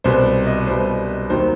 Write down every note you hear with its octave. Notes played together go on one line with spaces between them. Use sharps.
C2 B2 G3 C5
D#5
C2 B2 G3 C5
D#2 D#3 F#3 C5